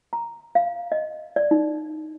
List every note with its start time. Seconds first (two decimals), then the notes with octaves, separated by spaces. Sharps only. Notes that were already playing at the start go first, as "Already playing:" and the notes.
0.13 A#5
0.55 F5
0.92 D#5
1.36 D5
1.51 D#4